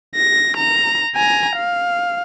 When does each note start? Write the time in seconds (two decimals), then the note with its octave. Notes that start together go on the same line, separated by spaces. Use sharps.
0.16 A#6
0.57 A#5
1.16 G#5 A#5
1.56 F5